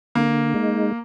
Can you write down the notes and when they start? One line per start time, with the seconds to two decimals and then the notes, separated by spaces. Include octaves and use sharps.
0.15 D3 A#3
0.54 G#3 D#4